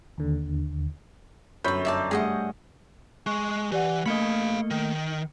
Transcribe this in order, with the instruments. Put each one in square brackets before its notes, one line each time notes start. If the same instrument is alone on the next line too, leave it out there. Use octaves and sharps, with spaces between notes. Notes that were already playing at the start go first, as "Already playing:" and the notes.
[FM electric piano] D#2 D3
[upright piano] G1 F#2 G6 [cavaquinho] B4 B5 [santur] C#5
[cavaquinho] D#4 D5 A5 [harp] E5
[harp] G2 A3 [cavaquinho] G#4 D#5 F#5
[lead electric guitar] G#3 [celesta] C#6
[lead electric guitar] E3 [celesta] G4 D5 F#5
[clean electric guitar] A3 A#3 D#5 [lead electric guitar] F5 B5 [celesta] C#7
[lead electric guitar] D#3